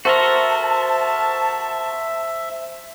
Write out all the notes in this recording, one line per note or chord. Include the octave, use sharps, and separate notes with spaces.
F#4 A4 A#4 C5 E5 A5